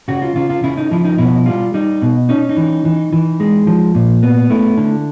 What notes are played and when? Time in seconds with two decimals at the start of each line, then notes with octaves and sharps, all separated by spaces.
0.08 C#3 F#4
0.22 F4
0.36 C#3 F4
0.50 F4
0.63 C#3 E4
0.77 D#4
0.91 F3 E4
1.05 D#4
1.18 B2 E4
1.46 G3 F4
1.74 G3 D#4
2.02 B2
2.29 C#4 D#4
2.49 D#4
2.57 E3
2.85 E3
3.13 E3
3.40 G#3
3.67 F3
3.95 A#2
4.23 B3
4.50 A3 E4
4.77 D3